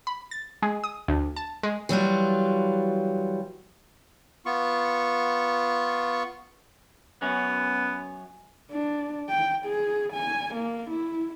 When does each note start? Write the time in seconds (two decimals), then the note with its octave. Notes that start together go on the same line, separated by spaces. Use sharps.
0.07 B5
0.31 A6
0.62 G#3
0.84 D#6
1.08 D2
1.36 A5
1.63 G#3
1.89 E3 F#3 G3 F4
4.46 B3 F4 C#6
7.22 F#2 B3 C#4
8.71 D4
9.29 G5
9.66 G#4
10.13 G#5
10.54 A#3
10.90 E4